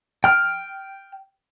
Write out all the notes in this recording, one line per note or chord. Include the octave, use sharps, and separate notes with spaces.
G5 F6